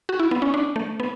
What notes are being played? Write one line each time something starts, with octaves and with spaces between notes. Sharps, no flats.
F#4
E4
B3
C#4
D4
A3
B3